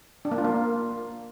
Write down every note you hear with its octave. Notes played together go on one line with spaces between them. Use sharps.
D4
A#3
F4
A#3